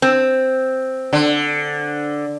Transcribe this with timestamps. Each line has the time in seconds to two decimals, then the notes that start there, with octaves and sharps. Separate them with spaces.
0.02 C4
1.13 D3